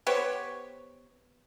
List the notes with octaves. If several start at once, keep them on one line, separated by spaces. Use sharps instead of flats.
B3 G4 C5 C#5